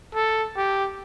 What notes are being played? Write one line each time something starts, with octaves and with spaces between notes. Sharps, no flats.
A4
G4